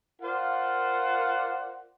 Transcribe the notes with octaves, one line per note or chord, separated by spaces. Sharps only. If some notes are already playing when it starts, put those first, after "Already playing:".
F4 A#4 C5 D5 F5 F#5